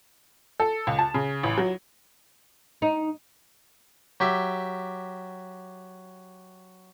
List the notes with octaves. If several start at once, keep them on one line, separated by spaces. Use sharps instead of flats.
A4
C#2
A5
C#3
A1
F#3
D#4
F#3 G4 E5